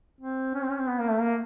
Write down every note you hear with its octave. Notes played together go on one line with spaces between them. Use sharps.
C4
C#4
C4
C#4
C4
B3
A#3
A3
A#3